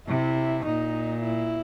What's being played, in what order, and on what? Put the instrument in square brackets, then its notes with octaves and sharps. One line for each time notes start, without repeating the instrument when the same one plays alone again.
[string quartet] C3 [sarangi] E4
[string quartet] A#2 [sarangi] D#4
[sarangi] E4